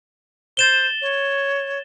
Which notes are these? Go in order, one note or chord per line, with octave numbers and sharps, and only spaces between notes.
C5 A6 E7 G7
C#5